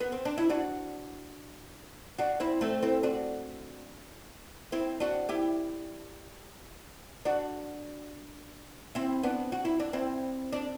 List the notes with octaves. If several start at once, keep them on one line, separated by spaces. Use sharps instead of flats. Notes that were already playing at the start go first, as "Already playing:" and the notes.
B3
C4
D4
E4
D4 F#4
D4 F#4
C4 E4
A3 C4
C4 E4
D4 F#4
C4 E4
D4 F#4
E4 G4
D4 F#4
C4 E4
B3 D4
F#4
E4
D4
C4 E4
D4